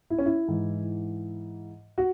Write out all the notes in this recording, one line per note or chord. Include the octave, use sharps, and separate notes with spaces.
E4
C#4
E4
G#2 E3
F#4